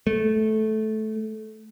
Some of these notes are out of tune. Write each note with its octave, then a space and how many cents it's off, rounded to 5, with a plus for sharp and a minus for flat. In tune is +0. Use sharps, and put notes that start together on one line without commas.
A3 -15